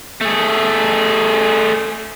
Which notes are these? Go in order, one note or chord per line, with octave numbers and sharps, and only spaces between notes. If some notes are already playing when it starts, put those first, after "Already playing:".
A3 G#4